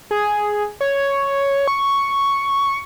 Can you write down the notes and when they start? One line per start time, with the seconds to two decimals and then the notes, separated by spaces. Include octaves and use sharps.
0.11 G#4
0.81 C#5
1.68 C#6